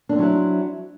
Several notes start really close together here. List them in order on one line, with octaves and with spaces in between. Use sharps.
D4 A3 C4 F#3 E4